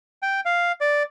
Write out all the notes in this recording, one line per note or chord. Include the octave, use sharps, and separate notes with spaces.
G5
F5
D5